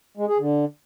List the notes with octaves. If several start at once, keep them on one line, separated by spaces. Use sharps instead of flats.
G#3
G#4
D3